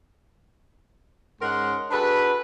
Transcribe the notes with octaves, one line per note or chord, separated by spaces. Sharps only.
G#2 C#4 D#4 A#4 F#5 C6
D4 F#4 G#4 A4 B4